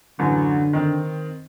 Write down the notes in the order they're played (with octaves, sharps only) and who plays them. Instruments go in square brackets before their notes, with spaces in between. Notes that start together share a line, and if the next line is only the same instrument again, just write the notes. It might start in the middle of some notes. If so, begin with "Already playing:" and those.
[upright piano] A1 F#2 [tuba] D3
[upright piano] D#3 C4